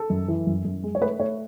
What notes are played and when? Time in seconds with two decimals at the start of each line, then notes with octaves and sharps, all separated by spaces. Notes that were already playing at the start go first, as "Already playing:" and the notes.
Already playing: A4
0.10 F#2
0.28 E3
0.47 F#2
0.65 F#2
0.83 G#3
0.95 C#5
1.01 A3 B4
1.20 A3 C#5